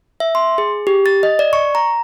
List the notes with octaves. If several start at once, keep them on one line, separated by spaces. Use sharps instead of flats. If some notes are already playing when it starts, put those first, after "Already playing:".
E5
C6
G#4
G4
A6
D#5
D5
C#6
A#5